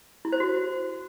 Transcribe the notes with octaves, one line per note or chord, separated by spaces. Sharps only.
E4
C5
F#4